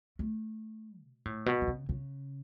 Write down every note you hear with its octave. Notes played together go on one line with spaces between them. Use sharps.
A3
B2
A2
B2
E3
C#3
C#3